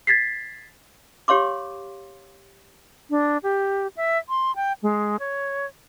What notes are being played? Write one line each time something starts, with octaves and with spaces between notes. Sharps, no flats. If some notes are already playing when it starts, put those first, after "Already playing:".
G#6 A6 B6 C7
G4 C#5 F5 C6 D6
D4
G4
E5
C6
G5
G#3
C#5